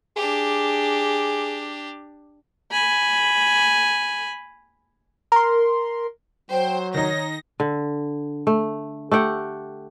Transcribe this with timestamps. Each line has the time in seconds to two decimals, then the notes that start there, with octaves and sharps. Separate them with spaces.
0.16 D4 G4 G#4
2.71 G#5 B5
5.32 A#4 C6
6.51 F#3 C5 G5
6.94 D#3 D#4 C#5 A#6
7.60 D3
8.47 A3
9.11 A3 G4 F#5 G5